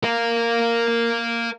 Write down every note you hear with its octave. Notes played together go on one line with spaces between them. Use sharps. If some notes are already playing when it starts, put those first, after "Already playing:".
A#4 F5